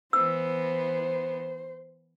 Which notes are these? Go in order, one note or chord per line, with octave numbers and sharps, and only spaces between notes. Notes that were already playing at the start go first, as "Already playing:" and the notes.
E3 B3 C5 E6